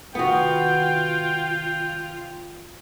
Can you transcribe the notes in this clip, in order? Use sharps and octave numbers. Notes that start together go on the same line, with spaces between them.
C3 D#3 B3 F4 F#4 G5